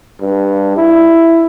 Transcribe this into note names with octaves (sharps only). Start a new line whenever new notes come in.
G2
E4